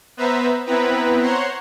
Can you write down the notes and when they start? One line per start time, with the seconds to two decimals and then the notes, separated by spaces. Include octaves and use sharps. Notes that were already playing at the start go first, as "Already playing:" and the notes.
0.17 B3 B4 C5 E5 A#5
0.66 B3 C4 E4 B4 A#5
1.21 C5 C#5 F#5 A#5 C6